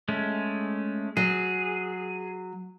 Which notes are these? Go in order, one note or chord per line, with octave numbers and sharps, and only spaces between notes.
G#3 A3 C#4
F#3 G#4